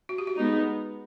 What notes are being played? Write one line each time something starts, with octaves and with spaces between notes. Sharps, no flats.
F#4
G4
F#4
G#3 B3 D#4